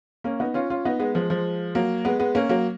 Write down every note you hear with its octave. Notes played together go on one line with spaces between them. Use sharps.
A#3 C#4
B3 D#4
C#4 F4
C#4 F4
B3 D#4
G#3 B3
F3 G#3
F3 G#3
F#3 A#3
G#3 B3
G#3 B3
A#3 C#4
F#3 A#3